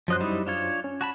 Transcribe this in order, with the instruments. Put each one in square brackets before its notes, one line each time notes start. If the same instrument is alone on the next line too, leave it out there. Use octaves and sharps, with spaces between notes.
[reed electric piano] F#2 F#3 C5 [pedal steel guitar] F3 D#5 F#6
[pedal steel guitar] G3 D#4 E4
D4 F4 C#5
[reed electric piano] C#4
[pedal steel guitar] F#4 A5 B5